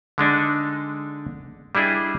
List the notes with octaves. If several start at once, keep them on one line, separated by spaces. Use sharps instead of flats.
D3 G#3 D4 D#4
G3 D4 E4 G#4 D#5